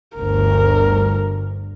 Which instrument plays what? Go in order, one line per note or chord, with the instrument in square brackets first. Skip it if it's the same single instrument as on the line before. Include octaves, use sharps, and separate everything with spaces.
[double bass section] G1 D2 [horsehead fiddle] A#4